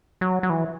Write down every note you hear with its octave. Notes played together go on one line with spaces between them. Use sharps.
F#3
F#3
E3